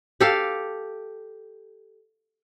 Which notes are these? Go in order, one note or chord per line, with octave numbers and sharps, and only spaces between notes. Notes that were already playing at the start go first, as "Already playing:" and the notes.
G4 A4 F5